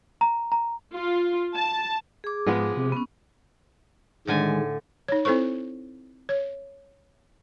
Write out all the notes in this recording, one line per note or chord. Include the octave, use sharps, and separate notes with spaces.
A#5
A#5
F4
A5
G#4 D6
G#2 F3 G#3 B3
C3
B3 C#4
A2 D3 D#3 G#3 G#5
D#4 C#5
C4 E4 A4 C5 C#6
C#5